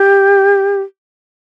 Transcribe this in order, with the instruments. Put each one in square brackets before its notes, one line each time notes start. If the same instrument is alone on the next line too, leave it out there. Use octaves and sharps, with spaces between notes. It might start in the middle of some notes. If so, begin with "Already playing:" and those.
Already playing: [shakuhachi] G4